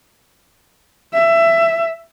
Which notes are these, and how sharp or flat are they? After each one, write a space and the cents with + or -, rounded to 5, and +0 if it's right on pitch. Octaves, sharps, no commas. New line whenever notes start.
E5 +20